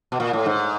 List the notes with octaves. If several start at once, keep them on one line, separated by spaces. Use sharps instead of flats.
B2
A#2
A2
G#2